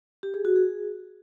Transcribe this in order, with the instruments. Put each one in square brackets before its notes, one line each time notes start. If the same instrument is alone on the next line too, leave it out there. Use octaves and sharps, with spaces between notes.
[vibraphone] G4
G#4
F#4
G#4